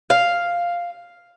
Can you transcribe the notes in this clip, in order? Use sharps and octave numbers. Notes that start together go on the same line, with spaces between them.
F5